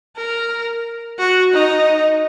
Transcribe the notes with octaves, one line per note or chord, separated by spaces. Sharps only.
A#4
F#4
D#4